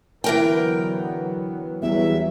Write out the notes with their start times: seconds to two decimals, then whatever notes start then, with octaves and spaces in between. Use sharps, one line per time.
0.24 D3 E3 F#3 B3 A#4 G5
1.82 E2 F#3 G3 E5